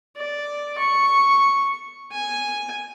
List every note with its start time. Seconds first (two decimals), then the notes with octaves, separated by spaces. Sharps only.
0.17 D5
0.78 C#6
2.12 G#5